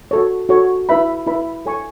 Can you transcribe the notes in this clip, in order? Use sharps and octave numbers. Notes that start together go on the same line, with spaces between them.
F#4 A4 C#5
F#4 A4 C#5
E4 B4 E5 B5
E4 B4 E5 B5
A4 C#5 G#5 C#6